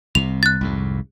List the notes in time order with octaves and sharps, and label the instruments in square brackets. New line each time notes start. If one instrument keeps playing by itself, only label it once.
[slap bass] C2 C3 [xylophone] F7
[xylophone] F#6 A6
[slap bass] C2 F2 G#2